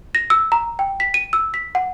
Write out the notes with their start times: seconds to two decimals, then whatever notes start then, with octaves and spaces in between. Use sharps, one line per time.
0.15 A#6
0.30 E6
0.52 A#5
0.79 G5
1.00 B6
1.14 D#7
1.33 E6
1.54 B6
1.75 F#5